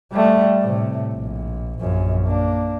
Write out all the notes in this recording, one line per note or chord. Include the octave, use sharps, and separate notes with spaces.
G3 A3
A2 C3
A#1
A#1 F#2
A#3 D4